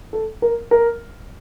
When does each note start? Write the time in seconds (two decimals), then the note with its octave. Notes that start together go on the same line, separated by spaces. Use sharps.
0.13 A4
0.42 A#4
0.71 A#4